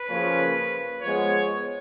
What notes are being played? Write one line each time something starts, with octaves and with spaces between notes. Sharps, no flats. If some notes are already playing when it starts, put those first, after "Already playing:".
Already playing: B4
C#3 F3 A#3 C#4
F3 G#3 B3 C#5
C#5